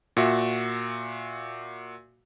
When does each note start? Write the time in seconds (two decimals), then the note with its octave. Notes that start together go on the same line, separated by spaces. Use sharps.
0.17 A#2 F#4 E5